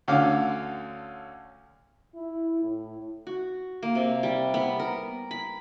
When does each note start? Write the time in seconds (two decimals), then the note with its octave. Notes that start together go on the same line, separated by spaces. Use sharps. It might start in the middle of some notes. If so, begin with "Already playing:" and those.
0.08 D2 D3 C#4 F5 D6
2.14 E4
2.62 A2
3.27 F#4
3.83 A#3
3.95 C3
4.23 G3
4.54 B3
4.80 A#4
5.31 B5